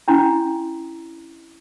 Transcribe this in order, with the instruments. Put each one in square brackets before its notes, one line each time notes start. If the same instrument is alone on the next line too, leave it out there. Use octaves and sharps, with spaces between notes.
[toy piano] C#4 D4 E4 A#5 C6